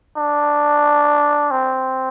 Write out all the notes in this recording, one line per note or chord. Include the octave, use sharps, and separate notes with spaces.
D4
C4